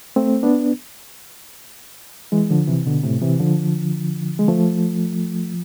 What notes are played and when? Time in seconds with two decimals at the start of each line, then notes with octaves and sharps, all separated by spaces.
0.16 A3 C4
0.43 B3 D4
2.32 E3 G#3
2.50 D3 F3
2.68 C3 E3
2.86 B2 D3
3.04 A2 C3
3.21 C3 E3
3.40 D3 F3
4.39 G#3
4.48 F3 A3